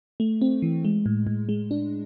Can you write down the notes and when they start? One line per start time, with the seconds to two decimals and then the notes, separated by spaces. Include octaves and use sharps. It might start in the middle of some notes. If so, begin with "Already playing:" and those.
0.20 A3
0.41 C4
0.62 E3
0.85 G#3
1.06 A2
1.27 A2
1.49 G#3
1.71 D4